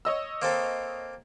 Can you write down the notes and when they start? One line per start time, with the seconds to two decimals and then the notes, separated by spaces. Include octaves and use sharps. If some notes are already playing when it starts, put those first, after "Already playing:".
0.05 C#5 D#5 E6
0.42 A#3 C4 A4